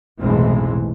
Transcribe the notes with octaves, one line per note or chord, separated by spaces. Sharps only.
F1 B1 A2 E3 G#3 C4